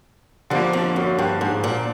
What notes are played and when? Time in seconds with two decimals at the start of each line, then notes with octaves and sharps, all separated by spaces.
0.50 G2 D3 F3 A#3
0.73 F2
0.96 F#2
1.18 G2
1.41 G#2
1.64 A#2